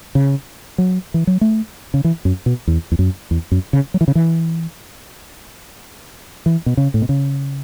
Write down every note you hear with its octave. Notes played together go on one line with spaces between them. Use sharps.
C#3
F#3
E3
F#3
A3
C#3
E3
F#2
B2
E2
E2
F#2
E2
F#2
C#3
F#3
E3
C#3
E3
E3
B2
C#3
A2
B2
C#3